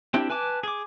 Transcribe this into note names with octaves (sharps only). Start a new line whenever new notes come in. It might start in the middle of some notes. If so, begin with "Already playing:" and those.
C4 D4 E4 G4
B4 G#5 A5 D6
G#4 D6